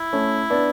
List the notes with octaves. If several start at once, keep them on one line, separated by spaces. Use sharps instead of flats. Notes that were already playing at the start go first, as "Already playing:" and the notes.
Already playing: E4
A3 C#4
B3 D4